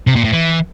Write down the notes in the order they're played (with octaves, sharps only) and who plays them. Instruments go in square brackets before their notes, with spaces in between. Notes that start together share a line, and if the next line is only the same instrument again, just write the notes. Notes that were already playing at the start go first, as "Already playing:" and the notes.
[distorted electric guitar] C3
A#2
A2
E3